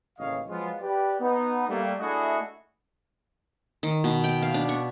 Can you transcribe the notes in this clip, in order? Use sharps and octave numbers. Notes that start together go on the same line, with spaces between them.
A1 D#2 C#3 C#5 D#5 F5
F3 F#3 G#3 B3 F4
G4 B4 D5
B3 D#4
G3 A3 A#3
A3 D4 E4 F#4 G#4 D#5
D#3
B2
G5
F5
D4
C#6